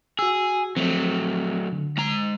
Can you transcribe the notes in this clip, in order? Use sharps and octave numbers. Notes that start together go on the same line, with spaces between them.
F#4 G#4 E6
F3 F#3 A3 C4
D3
G#3 A#5